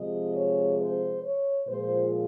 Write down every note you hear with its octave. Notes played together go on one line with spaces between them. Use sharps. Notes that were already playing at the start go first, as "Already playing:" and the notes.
Already playing: C3 F3 G#3 D#5
C#5
C5
C#5
A#2 F3 G#3 C5